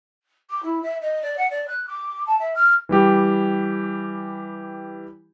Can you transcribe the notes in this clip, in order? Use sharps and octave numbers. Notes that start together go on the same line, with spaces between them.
D6
E4
E5
D#5
D5
F#5
D5
F#6
D6
A5
E5
F6
E3 G3 G4